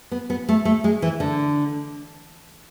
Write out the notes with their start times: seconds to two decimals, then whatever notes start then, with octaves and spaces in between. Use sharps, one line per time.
0.12 B3
0.30 B3
0.49 A3
0.65 A3
0.84 G#3
1.02 E3
1.20 D3